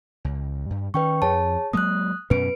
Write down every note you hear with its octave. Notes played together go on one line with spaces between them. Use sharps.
C#2
G2
D#3 C#4 B4 G5 C#6
F2 G#4 C#5 A5
F#3 G#3 A#3 D#6 F#6
F#2 B2 C#4 B4 D7